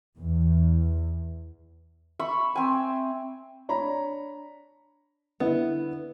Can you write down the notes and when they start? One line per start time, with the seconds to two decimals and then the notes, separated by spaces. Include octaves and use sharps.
0.19 E2
2.19 E5 B5 C#6
2.56 C4 G#5
3.69 D4 C#5 A#5 B5
5.40 D3 B3 E4